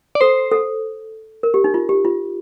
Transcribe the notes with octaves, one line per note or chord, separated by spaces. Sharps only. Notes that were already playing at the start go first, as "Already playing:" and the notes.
D5
A4 C5
A4
A#4
G4
D#4
F4
G4
F4